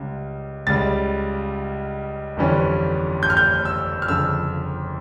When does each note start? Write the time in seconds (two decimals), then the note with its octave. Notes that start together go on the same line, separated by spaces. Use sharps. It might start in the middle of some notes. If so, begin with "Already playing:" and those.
Already playing: C#2 G3 C#4
0.67 C#2 C#3 G3 A6
2.37 G1 F2 E3 G3 C#4
3.23 G6
3.30 F6
3.37 G6
3.65 E6
4.02 F6
4.08 G1 F2 C#3 F3 E6